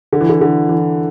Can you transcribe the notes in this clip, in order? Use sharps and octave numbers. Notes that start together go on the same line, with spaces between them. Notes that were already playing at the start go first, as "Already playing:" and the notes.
D3
E3
D3
D3
E3